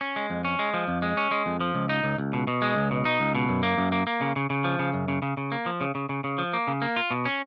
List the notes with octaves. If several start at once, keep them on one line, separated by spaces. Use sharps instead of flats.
C#4
G#3
F2
C#4
G#3
F3
F2
G#3
C#4
G#3
F2
F3
C#2
D#4
C#2
C#2
B2
B2
G#3
C#2
B2
D#4
C#2
B2
F#2
A#3
F#2
A#3
A#3
C#3
C#3
C#3
F3
C#3
F#2
C#3
C#3
C#3
A#3
F3
C#3
C#3
C#3
C#3
F3
A#3
C#3
A#3
F4
B2
C#4